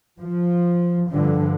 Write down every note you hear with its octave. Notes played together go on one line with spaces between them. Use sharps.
F3
G2 D3 F3